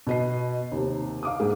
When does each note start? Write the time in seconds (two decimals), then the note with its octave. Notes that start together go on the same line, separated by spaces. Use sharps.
0.07 B2 D#5 C7
0.72 D#2 C3
1.23 F5 D6 D#6
1.40 G#2 G#4